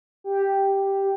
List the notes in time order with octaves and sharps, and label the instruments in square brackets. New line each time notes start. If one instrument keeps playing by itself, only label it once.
[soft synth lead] G4